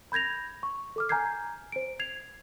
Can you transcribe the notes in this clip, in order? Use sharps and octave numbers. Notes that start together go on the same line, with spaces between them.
B5 G6 G#6 A#6 F7
C#6
A4 D6 F6
G#5 A#5 F6 G6 G#6 C7
C5 D7
G#6 C7 F7